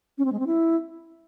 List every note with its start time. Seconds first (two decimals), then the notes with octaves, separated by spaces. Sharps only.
0.18 C#4
0.25 C4
0.32 G#3
0.39 C4
0.47 E4